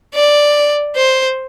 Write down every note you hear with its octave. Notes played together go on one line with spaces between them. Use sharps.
D5
C5